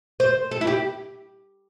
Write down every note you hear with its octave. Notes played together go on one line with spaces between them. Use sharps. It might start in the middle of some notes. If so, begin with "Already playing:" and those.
C5
A4
E4
G4